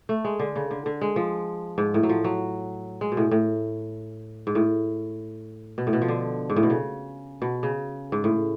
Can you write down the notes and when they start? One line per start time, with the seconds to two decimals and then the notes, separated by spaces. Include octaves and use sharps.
0.09 A3
0.25 G#3
0.40 D3
0.56 C#3
0.71 D3
0.86 D3
1.02 G#3
1.16 F3
1.78 G#2
1.94 A2
2.03 F#3
2.09 F3
2.24 F#3
3.01 G#3
3.12 B2
3.17 A2
3.31 A2
4.47 G#2
4.55 A2
5.78 B2
5.87 A2
5.93 B2
6.02 F3
6.08 D3
6.50 G#2
6.56 A2
6.63 B2
6.70 C#3
7.42 B2
7.63 C#3
8.12 G#2
8.24 A2